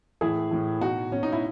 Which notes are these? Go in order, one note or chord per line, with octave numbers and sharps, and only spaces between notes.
A2 E3 E4 G#4
A2 E3
B2 D#4 F#4
B2 C#4
D#4
E4